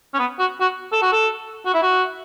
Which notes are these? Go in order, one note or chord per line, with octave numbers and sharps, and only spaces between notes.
C#4
B3
F#4
F#4
A4
F#4
A4
F#4
E4
F#4